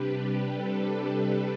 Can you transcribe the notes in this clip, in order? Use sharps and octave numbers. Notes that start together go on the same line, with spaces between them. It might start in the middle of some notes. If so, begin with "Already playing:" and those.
Already playing: C3 G3 D4 G4 B4
A4